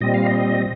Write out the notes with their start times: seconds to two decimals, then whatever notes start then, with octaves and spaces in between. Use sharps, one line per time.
0.01 A#2 G3 C4 D#5
0.14 F5
0.26 D#5